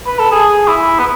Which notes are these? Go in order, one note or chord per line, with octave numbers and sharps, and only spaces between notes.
B4
A4
G#4
E4
B3